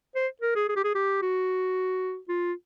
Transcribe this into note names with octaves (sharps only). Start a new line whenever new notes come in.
C5
A#4
G#4
G#4
G4
G#4
G4
F#4
F4